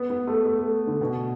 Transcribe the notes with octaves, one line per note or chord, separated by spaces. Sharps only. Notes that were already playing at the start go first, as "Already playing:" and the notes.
Already playing: B3
B3
A3
A3
A3
D3
B2